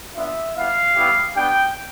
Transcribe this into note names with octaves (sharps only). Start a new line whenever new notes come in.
B3 D4 F4 E5
G3 B3 E4 F5
G3 B3 E4 G4
B3 D4 G4 G5